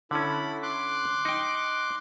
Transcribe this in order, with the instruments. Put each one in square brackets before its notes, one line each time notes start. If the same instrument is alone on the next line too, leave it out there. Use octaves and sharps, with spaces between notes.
[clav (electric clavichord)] D3 C#4 [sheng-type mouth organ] E4 A4 B5
[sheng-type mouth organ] C6 D6 F#6
[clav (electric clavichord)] D#4 G5